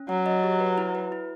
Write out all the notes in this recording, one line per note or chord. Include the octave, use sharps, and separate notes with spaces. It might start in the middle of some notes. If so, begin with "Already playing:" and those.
Already playing: C#4
F#3 F#5
D#5
G4
B4
E4
B4
E4